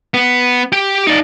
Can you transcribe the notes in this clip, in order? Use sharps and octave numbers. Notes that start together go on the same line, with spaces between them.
B3
G4 G5
D#4 D5